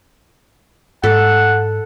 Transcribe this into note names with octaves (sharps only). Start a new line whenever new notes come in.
G#2 A4 F#5